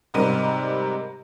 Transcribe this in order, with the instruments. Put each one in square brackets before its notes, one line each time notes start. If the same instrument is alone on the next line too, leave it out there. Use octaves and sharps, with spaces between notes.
[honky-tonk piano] G#2 C3 G3 A#4 D#7